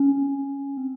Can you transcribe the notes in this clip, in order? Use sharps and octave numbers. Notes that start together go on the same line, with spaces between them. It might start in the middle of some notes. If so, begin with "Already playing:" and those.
Already playing: C#4
C4